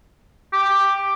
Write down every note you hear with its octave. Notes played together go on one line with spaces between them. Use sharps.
G4